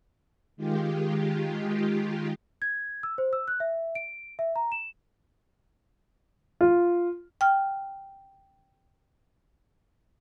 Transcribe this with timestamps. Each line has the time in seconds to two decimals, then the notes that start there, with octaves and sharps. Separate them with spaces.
0.57 D#3 G#3 F4 G4
2.62 G#6
3.03 E6
3.18 C5
3.33 E6
3.48 F#6
3.60 E5
3.95 D7
4.39 E5
4.56 A#5
4.72 E7
6.61 F4
7.41 G5 F6